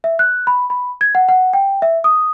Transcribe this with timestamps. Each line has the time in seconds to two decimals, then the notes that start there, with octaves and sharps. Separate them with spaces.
0.04 E5
0.19 F#6
0.47 B5
0.70 B5
1.01 G#6
1.15 F#5
1.29 F#5
1.53 G5
1.82 E5
2.04 D#6